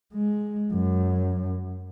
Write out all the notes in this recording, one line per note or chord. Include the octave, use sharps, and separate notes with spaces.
G#3
F#2